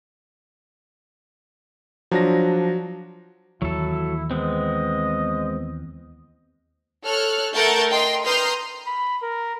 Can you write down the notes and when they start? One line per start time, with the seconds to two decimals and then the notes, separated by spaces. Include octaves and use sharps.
2.11 F3 F#3 D4 A#6
3.62 D#2 E3 F#3 E4 A4
4.31 G#3 B3 C4 D#5
7.04 A4 C#5 F6 F#6
7.53 A3 A4 A#4 F#5 G6 A6
7.92 D#5 G5 A#5 C6
8.25 B4 A#5 C6 D#6 F6 G6
8.87 B5
9.22 A#4